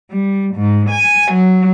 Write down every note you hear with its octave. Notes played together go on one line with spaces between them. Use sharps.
G3
G#2
G#5
F#3